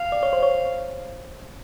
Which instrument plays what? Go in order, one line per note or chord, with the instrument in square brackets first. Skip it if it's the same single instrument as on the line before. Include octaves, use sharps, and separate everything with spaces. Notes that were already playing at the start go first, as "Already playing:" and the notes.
Already playing: [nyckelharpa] F5
[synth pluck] D5
C#5
C5
C#5